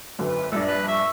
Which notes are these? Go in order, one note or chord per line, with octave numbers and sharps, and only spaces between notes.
G#1 F#2 D3 B4
A#1 G2 D4 A4 D5
B4
E5 C#6 E6